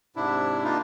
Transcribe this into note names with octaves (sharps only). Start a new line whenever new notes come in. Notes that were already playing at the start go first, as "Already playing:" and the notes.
G#2 C3 D4 E4
A#3 D4 D#4 F4